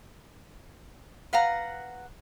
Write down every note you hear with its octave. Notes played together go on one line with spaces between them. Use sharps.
B4 F5 F#5 A#5